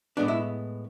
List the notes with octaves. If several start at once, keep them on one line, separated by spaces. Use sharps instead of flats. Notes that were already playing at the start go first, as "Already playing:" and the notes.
A2 G#3 B3 D4
E4